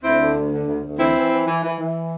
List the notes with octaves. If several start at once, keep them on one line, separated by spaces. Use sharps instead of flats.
D2 C4 E4
D3
D2
D3
D2
D2
E3 C4 E4
E3
E3
E3
E3
E3